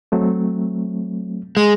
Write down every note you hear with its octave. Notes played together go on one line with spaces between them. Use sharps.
F#3 A3 C4
G#3